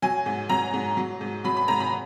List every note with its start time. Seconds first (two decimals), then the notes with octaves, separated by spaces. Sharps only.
0.02 F#3 G#5
0.26 G#2
0.49 F#3 A#5
0.74 G#2
0.97 F#3
1.21 G#2
1.44 F#3 B5
1.57 B5
1.68 G#2 A#5
1.80 B5